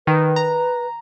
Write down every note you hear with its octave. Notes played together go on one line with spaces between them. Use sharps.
D#3 B4
A#5